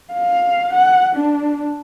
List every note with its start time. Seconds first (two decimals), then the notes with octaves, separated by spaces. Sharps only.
0.13 F5
0.73 F#5
1.15 D4